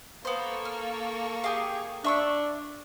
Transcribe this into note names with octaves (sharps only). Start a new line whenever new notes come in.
A#3 B3 A4 C5 C#6
F6
G4 G#4 F5
D4 E5 C#6 E6